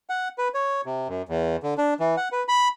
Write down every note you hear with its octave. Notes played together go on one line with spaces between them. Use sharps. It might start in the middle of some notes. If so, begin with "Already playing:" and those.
F#5
B4
C#5
C3
F#2
E2
D3
D4
E3
F#5
B4
B5